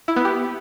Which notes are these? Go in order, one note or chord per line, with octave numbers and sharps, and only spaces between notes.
E4
B3
G4